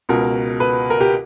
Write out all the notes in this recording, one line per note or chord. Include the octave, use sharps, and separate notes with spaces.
C#2 B2 A#4
B4
A#4
G4